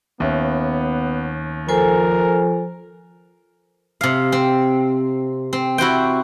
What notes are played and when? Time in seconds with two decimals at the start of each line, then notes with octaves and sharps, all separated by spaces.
0.20 D#2 B3 C#4 E5
1.69 F3 A4 A#4 C5 G#5
4.01 C3 F5
4.32 C4
5.53 C4
5.78 E4 F#4 C5 G5